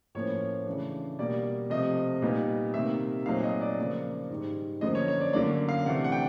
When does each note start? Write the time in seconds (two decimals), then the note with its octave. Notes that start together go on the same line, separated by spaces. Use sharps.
0.15 A2 F3 A#3 C#4 C#5
0.66 C#3 E3 A3 D4
1.19 B2 G3 A#3 D5
1.70 C3 F3 A3 D#5
2.22 A#2 G3 B3 D#4
2.74 C3 D#3 G3 A#3 E5
3.26 A#2 F#3 A3 C4 D#4 F5
3.43 D#5
3.61 D5
3.78 C#3 F3 A#3
4.30 G#2 D#3 G3
4.81 F#2 D3 F3 A#3 D#5
4.95 C#5
5.08 C#5
5.20 D5
5.33 F#2 D3 F#3 A#3 D5
5.69 F5
5.85 C3 E3 A3 D4 F#5
6.04 F#5
6.12 G5